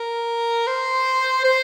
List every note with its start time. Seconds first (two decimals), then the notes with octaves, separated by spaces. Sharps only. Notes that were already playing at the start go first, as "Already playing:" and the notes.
Already playing: A#4
0.67 C5
1.44 C5